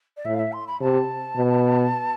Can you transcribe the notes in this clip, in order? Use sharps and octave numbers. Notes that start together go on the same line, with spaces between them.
D5
A2 E5
F5
E5
C6
B5
C3 A5
B2